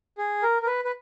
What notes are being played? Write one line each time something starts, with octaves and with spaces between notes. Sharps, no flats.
G#4
A#4
A#4
B4
B4